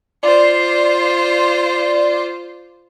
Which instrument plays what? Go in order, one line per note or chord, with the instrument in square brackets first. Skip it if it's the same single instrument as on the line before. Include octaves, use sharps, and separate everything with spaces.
[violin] F4 C5 [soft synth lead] D5